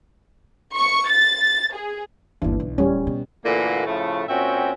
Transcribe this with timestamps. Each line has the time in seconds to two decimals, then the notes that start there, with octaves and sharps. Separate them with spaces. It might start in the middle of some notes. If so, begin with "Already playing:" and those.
0.76 C#6
1.10 A6
1.74 G#4
2.42 G1 D#2 E3 D4
2.60 B1
2.78 D1 G3 C#4
3.07 B2
3.45 A#2 D3 E3 A3 A#3 F#4
3.86 A2 C#3 F3 A3
4.29 A#2 C4 C#4 F#4 E5 G5